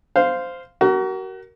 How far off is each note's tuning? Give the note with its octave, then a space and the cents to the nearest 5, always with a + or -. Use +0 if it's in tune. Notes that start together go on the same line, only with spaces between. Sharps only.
C5 -10 F5 +0
F#4 +35 A#4 +0